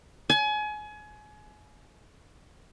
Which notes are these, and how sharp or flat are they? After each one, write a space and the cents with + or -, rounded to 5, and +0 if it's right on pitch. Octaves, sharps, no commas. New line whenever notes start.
G#5 +30